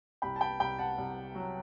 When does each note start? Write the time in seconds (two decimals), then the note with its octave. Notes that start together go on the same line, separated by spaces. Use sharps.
0.22 C2 G5 B5
0.36 A5
0.41 G5 B5
0.60 C2 G5 B5
0.78 F#5 A5
0.98 C2
1.35 F#3